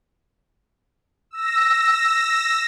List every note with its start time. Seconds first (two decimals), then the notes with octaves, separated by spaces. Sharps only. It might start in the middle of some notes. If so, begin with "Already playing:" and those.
1.31 E6 A#6